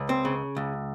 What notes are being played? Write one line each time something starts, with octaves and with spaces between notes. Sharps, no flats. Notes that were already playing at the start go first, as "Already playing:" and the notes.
Already playing: C#2
C4
C#3
C#2